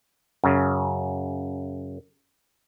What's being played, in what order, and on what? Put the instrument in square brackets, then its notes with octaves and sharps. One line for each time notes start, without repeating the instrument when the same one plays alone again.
[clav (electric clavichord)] F#2 C#3